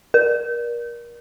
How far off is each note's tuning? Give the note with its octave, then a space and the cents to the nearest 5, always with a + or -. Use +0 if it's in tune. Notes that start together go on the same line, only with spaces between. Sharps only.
A#4 +30